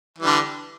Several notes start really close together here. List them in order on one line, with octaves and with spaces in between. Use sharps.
E3 G3 D3